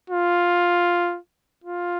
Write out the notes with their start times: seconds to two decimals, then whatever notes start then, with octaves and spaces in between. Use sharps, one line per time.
0.10 F4
1.64 F4